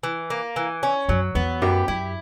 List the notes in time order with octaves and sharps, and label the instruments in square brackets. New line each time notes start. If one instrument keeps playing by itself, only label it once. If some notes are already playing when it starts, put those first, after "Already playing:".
[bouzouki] E3
A#3
E3
C#4
[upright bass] F#2 [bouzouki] F#3
[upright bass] E2 [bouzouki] B3
[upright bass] F#2 [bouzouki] G4
[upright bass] F#2 [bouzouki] E4